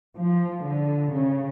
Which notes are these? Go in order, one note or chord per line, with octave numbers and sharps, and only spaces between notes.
F3
D3
C#3